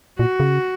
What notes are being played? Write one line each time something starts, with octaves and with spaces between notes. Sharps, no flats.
A#2 F#4
C#3